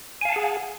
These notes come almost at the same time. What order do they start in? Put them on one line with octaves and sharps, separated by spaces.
G#5 F5 A5 F#5 G#4